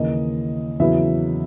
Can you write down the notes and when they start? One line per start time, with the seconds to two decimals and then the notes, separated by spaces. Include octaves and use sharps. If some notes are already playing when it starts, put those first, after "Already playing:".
Already playing: D#2 C#3 E3 A#3 D#5
0.80 E2 C#3 F#3 B3 E4 E5